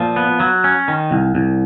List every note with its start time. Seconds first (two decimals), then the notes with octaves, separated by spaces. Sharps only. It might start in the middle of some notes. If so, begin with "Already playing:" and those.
Already playing: A#2 F3
0.16 B3
0.40 F#3
0.64 C#4
0.88 D#3
1.11 C2
1.35 C2